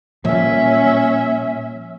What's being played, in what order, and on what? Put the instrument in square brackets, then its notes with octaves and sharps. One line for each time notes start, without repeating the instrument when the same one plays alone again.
[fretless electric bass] A#2 [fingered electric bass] F3 G3 [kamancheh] C#4 E5